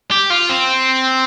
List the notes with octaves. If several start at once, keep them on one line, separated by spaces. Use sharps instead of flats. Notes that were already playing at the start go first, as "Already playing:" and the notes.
G4
F4
C4